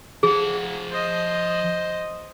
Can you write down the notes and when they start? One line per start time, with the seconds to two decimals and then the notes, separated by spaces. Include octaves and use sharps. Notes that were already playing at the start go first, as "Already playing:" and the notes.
0.23 F3 G#4 F#5
0.92 C5 D#5